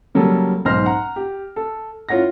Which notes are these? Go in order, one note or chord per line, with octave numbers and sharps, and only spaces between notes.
C#3 F#3 G3 A#3 A4
B1 G#2 C5 C6 F6 A#6
F#5 A#5
G4
A4
C#4 E4 F4 C#5 F#5 A#6